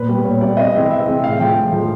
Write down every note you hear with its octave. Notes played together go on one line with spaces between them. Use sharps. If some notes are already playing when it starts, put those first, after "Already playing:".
Already playing: A#2 B4
G3 B3
A#2 C#5
G3 B3 D5
C3 D#5
E3 G#3 C4
C3 E5
E3 G#3 C4
A2 F5
F3 G#3 G5
A2
F3 G#3